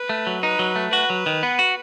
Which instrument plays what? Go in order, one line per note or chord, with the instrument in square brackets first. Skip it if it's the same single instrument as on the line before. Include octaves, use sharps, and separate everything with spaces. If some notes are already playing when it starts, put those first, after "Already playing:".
Already playing: [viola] B4
[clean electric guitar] A3
F#3
[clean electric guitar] D#4 [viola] B4
[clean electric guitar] F#3
A3
[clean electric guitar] F#4 [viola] B4
[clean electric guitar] F#3
D#3
B3
F#4